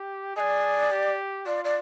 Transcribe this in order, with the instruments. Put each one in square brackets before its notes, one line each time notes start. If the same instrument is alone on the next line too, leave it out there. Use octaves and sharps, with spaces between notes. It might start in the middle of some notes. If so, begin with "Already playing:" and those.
Already playing: [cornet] G4
[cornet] G#4 [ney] D5 D#5
[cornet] G4
[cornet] F4 [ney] D5
[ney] D5